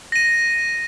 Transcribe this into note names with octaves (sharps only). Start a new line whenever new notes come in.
A#6 D#7